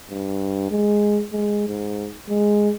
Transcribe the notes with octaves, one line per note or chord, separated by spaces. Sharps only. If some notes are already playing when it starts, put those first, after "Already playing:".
G2
G#3
G#3
G#2
G#3